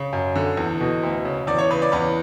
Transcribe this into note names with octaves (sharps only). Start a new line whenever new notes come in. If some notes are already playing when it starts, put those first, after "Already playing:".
Already playing: C#3
F#2
D3
E2
B2
D2
C#3
E2 D5
C#5
C#3 B4
D5
E2 B4